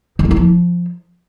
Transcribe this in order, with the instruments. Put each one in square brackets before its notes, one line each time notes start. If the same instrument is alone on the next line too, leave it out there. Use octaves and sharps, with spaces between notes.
[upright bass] D#3
G#3
E4
F3